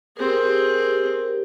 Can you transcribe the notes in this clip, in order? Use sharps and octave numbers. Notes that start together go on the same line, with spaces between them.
C4 G4 G#4 A#4